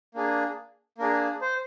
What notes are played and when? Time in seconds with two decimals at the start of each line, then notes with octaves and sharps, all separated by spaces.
0.15 A#3 D4 G#4
0.98 A#3 D4 G#4 A#4
1.41 C5